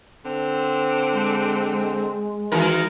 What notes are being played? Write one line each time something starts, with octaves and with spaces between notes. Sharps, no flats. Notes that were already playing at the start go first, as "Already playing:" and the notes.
D3 C4
G#3
E2 D#3 E3 F#3 A#4